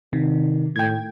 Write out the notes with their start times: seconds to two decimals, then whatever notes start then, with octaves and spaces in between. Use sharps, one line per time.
0.13 C3 D#3
0.76 A2 G5 G#6